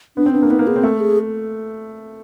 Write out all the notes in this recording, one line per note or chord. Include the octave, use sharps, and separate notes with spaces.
B3 D4
C4
B3 D4
A#3
B3 D#4
A#3
B3 G#4
C4
A3 A4
G#4